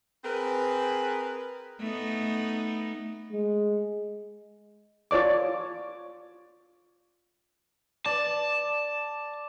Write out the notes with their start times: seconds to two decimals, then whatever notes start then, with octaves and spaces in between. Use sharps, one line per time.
0.25 C4 G#4 A#4 B4
1.80 A3 B3 D#4
3.32 G#3
5.11 F4 C#5 D5 D6
8.06 D5 A5